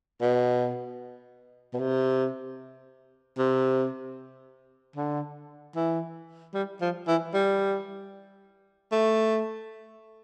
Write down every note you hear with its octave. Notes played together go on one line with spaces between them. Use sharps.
B2
B2
C3
C3
D3
E3
G3
F3
E3
G3
A3